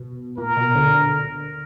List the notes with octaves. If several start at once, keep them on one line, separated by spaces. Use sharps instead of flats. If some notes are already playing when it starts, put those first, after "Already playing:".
Already playing: B2
A#2 A#4
B2
D2 D3